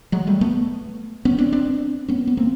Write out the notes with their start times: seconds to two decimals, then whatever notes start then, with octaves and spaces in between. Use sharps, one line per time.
0.12 F#3 G#3
0.27 G3 A3
0.41 A3 B3
1.25 B3 C#4
1.38 C4 D4
1.52 C4 D4
2.08 B3 C#4
2.27 B3
2.37 A#3 C4